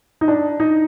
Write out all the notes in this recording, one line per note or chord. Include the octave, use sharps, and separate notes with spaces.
D#4
D4
D#4